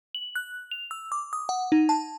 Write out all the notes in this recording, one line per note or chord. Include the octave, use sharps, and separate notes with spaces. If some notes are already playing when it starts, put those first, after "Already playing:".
F#7
F#6
F7
E6
D6
D#6
F#5
D#4
A5